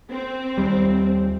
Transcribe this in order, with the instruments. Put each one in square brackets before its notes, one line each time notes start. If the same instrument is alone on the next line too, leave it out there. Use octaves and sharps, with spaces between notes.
[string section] C4
[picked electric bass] D#2 G3